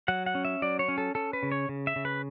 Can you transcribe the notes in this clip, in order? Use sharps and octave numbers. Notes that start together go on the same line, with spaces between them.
F#3 F#5
F#5
C#4
E5
F#3 D5
C#5
C#4
A4
C#4 A4
B4
C#3
C#5
C#3
E5
C#3
B4